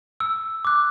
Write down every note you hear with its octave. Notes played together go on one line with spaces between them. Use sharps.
E6
D6 F#6